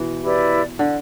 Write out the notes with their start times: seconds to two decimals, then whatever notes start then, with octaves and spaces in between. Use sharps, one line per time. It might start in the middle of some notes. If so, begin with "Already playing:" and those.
Already playing: B2 E3
0.21 E4 G4 B4 D5
0.79 D3